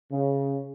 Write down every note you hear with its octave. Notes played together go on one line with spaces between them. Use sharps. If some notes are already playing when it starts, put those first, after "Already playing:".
C#3